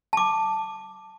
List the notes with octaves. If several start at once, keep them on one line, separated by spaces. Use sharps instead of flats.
A5 D6